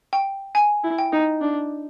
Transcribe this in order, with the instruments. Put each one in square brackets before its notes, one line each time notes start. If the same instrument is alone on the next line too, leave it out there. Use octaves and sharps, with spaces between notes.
[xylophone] G5
G#5
[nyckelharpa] E4
[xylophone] G5
[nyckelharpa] D#4
D4